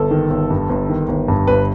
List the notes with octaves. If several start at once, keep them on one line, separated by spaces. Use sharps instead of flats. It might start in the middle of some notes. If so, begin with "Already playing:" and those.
Already playing: G1 A4
D#3
G1
G2
G1
D#3
G1
G2
G1 B4